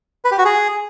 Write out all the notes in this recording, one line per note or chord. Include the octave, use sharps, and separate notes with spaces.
B4
G4
F#4
G#4